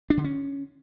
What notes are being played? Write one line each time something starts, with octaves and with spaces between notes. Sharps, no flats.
D4
D3
C#4